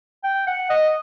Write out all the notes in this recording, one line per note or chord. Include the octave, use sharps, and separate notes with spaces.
G5
F#5
D#5